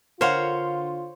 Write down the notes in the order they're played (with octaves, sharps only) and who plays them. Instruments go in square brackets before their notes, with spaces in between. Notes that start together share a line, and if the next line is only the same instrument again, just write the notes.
[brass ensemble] D3 F4 [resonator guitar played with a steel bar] A#4 F5 F#5 [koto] C5 C#5